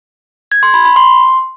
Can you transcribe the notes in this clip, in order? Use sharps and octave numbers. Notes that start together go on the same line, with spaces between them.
G#6
C6
B5
B5
C6